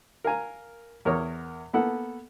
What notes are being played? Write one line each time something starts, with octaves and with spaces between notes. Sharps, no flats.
A#4 F5 G#5 A#5
E2 A#4 C#5 D#6
A#3 B3 A4 F#5